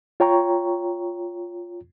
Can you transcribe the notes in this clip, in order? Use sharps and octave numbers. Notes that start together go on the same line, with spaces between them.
F4 C#5 G5 A#5 C#6